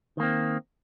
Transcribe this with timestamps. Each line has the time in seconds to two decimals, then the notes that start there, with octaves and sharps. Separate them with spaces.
0.17 D#3
0.20 A#3
0.23 C4